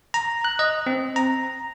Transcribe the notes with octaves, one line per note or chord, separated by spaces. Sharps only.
A#5
F#6
D#5
C4
A#5